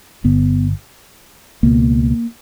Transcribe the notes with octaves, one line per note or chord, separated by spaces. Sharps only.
G1 G2 D3 B3
C#2 B2 A#3